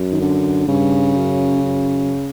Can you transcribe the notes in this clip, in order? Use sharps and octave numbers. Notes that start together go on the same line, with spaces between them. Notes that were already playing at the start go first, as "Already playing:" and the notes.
Already playing: F#2
D#3
D3
G2 C#3
F#2
F#2